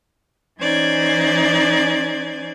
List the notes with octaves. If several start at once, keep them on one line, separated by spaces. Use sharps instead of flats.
E3 C#4 D#4 C5 D5 G#6